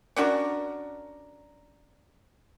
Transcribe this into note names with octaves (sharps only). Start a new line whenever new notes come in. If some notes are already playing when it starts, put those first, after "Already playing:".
C#4 D4 F#4 A#4